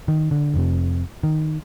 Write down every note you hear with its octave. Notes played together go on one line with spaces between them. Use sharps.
D#3
D3
F1 F2 C3
D#3